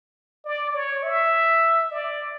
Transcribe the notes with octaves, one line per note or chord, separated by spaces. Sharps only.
D5
C#5
E5
D5